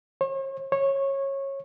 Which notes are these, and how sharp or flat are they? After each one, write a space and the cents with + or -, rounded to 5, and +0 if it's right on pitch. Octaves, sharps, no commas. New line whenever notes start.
C#5 -45
C#5 -20